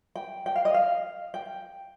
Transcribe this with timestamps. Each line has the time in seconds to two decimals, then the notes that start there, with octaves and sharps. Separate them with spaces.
0.16 G5
0.46 G5
0.56 F5
0.65 D#5
0.74 F5
1.34 G5